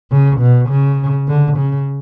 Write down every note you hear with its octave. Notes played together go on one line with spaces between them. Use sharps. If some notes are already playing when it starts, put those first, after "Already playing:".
C#3
B2
C#3
D3
C#3